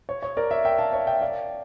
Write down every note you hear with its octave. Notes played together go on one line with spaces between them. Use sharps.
C#5
C#5
A#4 D5
C#5 E5
E5 G5
F5 A5
C#5 E5
E5 G5
D5 F5